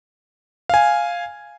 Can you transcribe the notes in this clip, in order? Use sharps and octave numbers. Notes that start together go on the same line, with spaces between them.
F5 G#5